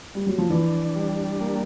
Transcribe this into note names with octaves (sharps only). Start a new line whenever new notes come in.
G3
F#3
F3
E3 D4
G3
A#3